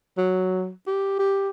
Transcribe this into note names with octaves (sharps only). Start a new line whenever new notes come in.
F#3
G4
G4